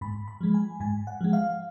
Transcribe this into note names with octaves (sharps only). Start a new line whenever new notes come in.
G#2 B5
B5
F3 G#3
G#5
G#2 G#5
F#5
F3 G#3
F5